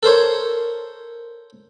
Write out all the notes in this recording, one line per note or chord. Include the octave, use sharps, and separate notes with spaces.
A4 A#4 C5 C#5